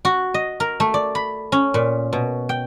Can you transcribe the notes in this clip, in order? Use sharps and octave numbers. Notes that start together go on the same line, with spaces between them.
F#4
D#5
A#4
A3
D5
B5
C#4
A#2
B2
G5